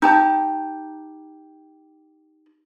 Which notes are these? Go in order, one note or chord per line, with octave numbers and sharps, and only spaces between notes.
D#4 G4 A5